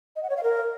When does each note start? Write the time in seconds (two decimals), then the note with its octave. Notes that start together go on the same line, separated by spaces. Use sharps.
0.16 D#5
0.23 F#5
0.30 C#5
0.37 F5
0.43 A#4